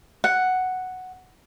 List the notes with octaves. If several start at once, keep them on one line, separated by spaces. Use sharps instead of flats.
F#5